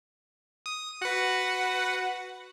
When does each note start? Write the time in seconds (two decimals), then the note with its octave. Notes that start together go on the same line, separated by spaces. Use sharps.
0.66 D#6
1.02 F#4 B4 F#5